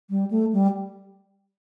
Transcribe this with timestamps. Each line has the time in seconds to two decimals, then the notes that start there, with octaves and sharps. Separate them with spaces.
0.10 G3
0.31 A3
0.53 G3